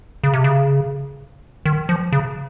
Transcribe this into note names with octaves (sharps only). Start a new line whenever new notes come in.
C#3
C3
C#3
D#3
F3
C#3